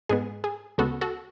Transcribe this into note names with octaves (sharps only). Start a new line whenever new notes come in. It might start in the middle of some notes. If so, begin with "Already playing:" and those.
G#2 G#3 B3 G#4
G#4
D2 C#3 G#3 B3 F#4 A4
F#4 A4